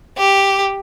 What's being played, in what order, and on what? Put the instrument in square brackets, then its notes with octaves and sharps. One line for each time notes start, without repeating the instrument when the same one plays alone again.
[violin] G4